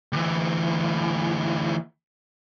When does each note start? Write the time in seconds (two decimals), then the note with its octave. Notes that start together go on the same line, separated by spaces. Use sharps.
0.13 D2 E3